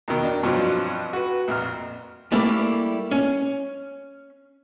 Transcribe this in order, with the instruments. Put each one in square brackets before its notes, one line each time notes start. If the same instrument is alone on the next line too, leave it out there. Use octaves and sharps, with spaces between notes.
[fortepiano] F2 B2 D#3
D4
G2 B2 F3 F#3 C4
F#4 B4
A#1 F2 F6
[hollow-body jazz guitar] G3 A3 A#3 E4 G4
C#4